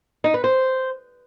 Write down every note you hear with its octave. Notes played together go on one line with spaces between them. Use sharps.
D#4
B4
C5